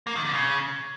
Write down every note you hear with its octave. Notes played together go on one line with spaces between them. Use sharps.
A#3
D#3
D3
C#3